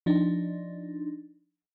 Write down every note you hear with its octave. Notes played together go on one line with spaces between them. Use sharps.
F3 D4 D#4